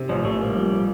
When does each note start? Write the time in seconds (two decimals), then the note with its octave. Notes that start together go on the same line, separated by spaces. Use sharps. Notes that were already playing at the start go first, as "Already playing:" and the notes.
Already playing: C3
0.09 A1 F3
0.25 A1 A3
0.40 G3 A#3
0.56 F3